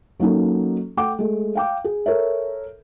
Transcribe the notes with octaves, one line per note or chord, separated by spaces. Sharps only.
F#3 A#3 C#4 D#4 A4
A3 F#5 G5 D6
G#3 A3
F5 G5 D6
G#4
A4 A#4 C#5 E5